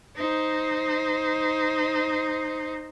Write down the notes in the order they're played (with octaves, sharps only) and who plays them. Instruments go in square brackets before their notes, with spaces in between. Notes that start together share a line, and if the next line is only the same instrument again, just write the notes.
[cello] D#4 C5